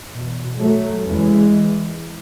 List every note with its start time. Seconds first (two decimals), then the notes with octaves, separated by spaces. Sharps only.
0.11 E2 B2
0.57 F#3 A3
1.03 E2 C#3 E3 G#3